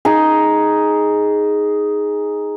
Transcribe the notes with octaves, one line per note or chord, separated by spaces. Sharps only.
D#4 G#4